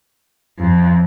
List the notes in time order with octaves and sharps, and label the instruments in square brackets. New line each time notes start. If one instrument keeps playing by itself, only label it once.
[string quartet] F2